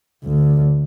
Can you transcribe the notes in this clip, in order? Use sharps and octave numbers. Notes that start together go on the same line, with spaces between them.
D2